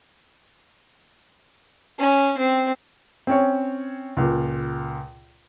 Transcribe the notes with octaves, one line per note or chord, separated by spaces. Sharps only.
C#4
C4
C4 C#4 C#5
C#2 A#2